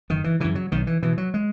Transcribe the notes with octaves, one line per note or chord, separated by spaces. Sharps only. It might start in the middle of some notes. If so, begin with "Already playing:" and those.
F#1 D#3
E3
F#2 C#3 E3
F#3
B1 D#3
E3
B2 E3
F#3
G#3